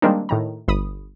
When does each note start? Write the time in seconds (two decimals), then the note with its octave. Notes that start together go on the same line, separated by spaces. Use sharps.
0.02 D#3 G3 G#3 A#3 C4 D4
0.29 A2 D#3 A#5
0.68 G1 B5 D#6